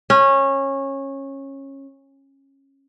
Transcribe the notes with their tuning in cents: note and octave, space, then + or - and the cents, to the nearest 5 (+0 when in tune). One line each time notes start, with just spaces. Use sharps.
C#4 -20